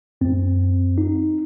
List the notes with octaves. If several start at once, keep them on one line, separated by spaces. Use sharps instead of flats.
F#2 C4
D#4